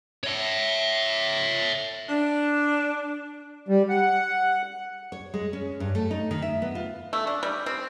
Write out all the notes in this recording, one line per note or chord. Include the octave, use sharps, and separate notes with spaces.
C#5 E5
D4
G3
F#5
C#5
G#3
C#4
G2
A3
D#4
D#3
E5
B3
F4
A3
D4
G3
C4